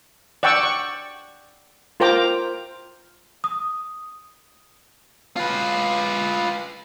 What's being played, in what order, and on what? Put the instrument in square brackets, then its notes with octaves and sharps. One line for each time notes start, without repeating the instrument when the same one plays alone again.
[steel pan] D5 F#5 G5 C#6 E6
C#6
F4 A#4 C5 G5 A#5 D6
[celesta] D#6
[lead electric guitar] F4 B4